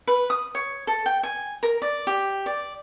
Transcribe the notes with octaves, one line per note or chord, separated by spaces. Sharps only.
B4
D#6
C#5
A4
G5
G#5
A#4
D5
G4
D5